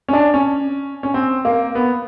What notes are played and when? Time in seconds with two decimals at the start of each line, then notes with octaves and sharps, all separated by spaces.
0.08 C#4
0.13 D4
0.34 C#4
1.03 C#4
1.14 C4
1.45 A#3
1.75 B3